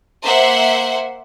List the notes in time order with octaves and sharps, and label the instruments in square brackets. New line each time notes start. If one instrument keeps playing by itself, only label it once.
[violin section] A#3 C5 E5 F#5